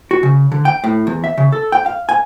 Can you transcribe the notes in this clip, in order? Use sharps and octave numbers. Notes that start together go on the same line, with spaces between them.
F#4
C#3
D3
G5
A2
E2
E5
C#3
A4
G5
F5
G#5